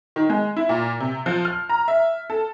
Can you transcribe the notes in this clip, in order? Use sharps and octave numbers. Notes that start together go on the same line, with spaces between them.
D#3
G#3
E4
A#2
C3
F3
F6
A#5
E5
A4